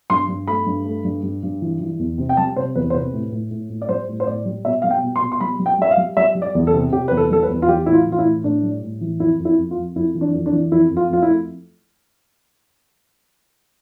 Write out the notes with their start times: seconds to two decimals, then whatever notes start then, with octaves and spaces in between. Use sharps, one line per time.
0.10 G2 C6
0.28 G2
0.47 A3 B5
0.66 G2
0.85 A3
1.04 G2
1.23 G2
1.43 G2
1.62 E3
1.80 E3
1.99 E2
2.18 C3
2.29 G5
2.37 G3 A5
2.56 C3 C5
2.75 E2 B4
2.90 C5
2.94 C3 B4
3.13 A2
3.32 A2
3.51 A2
3.70 A2
3.82 D5
3.89 G3 C5
4.08 A2
4.20 C5
4.27 A2 D5
4.46 G3
4.65 B2 E5
4.82 G3 F5
4.90 G5
5.03 B2
5.16 C6
5.22 B2
5.32 C6
5.40 G3 B5
5.59 G3
5.66 G5
5.79 G3 E5
5.91 F5
5.97 G3
6.17 G3 E5
6.35 G3
6.42 D5
6.55 E2
6.67 A4
6.73 C3
6.92 C3 G4
7.08 E2 B4
7.17 A4
7.30 G3 A4
7.43 B4
7.49 E2
7.62 F4
7.68 E3 G4
7.86 A2 E4
7.93 F4
8.06 E3
8.12 F4
8.18 E4
8.25 A2
8.44 A2 D4
8.63 G3
8.82 A2
9.01 E3
9.20 F2 E4
9.39 F2
9.45 E4
9.58 F2
9.71 F4
9.77 F2
9.95 F2 E4
10.15 E3
10.21 D4
10.34 F2
10.46 D4
10.53 E3
10.72 F2 E4
10.91 F2
10.97 F4
11.10 F2 F4
11.22 E4
11.28 A3